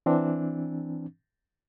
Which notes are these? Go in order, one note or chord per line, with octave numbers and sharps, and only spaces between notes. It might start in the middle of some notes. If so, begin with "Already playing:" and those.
E3 C4 D4